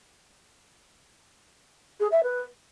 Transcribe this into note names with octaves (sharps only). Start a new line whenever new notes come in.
G#4
E5
B4